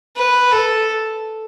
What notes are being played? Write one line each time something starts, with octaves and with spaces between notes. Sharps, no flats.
B4
A4